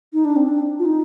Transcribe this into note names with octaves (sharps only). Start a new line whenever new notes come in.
D#4
D4
C4
D4
F4
D#4